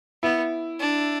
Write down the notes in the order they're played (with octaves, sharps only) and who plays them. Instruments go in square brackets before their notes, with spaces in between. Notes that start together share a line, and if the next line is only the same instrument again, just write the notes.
[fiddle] B3 [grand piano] E4
[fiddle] D4